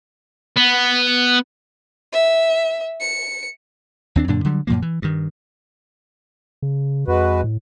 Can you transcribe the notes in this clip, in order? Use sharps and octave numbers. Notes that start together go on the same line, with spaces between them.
B3
E5
C#7
D#2 C4 D4
F#2 A#2 D3 D4
D3 F#3 G3
F#2 A#2 F3 A#3
E3
G2 D#3
C#3
F2 G#3 F#4 B4
A2